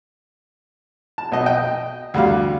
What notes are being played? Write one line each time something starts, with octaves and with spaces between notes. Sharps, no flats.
A5
B1 D#5
D#5 G5
D2 G3 F5